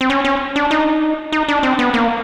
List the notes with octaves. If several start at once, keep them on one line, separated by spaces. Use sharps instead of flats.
C4
C#4
C#4
D4
D#4
D#4
D4
C4
B3
A#3